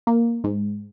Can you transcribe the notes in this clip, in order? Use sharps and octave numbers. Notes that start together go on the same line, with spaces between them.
A#3
G#2